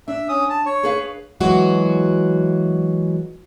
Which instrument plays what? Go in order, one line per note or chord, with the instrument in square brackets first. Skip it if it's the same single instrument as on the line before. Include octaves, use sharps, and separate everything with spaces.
[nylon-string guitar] D4 [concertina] E5
[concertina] C#4 D#6
A5
C#5
[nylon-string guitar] G#4 B4 F5
[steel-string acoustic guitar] E3 F#3 G#3 F#4